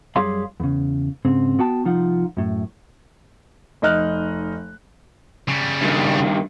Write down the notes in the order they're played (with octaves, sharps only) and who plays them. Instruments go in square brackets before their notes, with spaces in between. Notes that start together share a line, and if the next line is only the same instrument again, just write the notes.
[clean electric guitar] F#2 G3 G#4 C#5 F5 C6
E2 C#3
G#2 C#3 C4
B3 F#4 G5 A5
C2 F3 D#4 F4 F#5
F#2 A2
[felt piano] F1 D#4 D#5 F6 F#6
[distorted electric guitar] C#3 G3
[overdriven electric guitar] G2 D#3